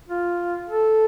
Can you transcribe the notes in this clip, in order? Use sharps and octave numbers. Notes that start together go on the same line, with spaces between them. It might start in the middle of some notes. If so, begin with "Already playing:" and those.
F4
A4